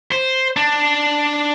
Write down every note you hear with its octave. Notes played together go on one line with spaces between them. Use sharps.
C5
D4